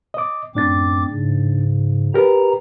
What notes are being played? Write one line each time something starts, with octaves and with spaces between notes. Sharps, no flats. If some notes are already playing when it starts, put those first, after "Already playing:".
D#5 D6
F#2 A2 C4 D4 D6 A6
G#2 C#3
G4 A#4 B4 A#5